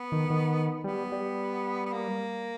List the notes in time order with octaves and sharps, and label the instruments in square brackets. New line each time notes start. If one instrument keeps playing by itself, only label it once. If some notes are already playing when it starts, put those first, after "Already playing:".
Already playing: [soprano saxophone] B3
[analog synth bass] D#3
D#3
[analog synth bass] G3 [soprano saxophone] B3
[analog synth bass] G3
[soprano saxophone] B3
A#3